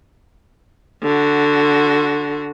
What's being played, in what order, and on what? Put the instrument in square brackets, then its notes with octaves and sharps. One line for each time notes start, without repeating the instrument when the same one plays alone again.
[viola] D3 F#4